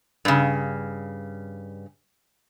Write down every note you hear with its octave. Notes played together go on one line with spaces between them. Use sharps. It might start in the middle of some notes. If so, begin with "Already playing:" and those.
G2 C#3